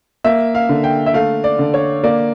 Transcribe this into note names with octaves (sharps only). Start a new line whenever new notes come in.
A#3 E5
F5
D3
G5
E5
A3 F5
D5
D3
C#5
A#3 D5